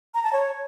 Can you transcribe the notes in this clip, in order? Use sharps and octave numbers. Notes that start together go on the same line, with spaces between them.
A#5
A5
C#5